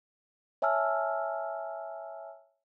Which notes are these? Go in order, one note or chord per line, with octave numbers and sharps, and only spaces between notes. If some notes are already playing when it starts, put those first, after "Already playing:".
C#5 E5 G#5 A5 E6 F6